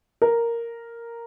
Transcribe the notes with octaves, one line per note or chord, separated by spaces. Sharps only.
A#4